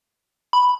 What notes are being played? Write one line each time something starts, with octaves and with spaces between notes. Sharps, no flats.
B5